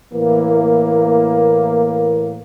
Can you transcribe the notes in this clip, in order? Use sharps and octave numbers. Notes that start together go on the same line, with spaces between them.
A2 E3 A#3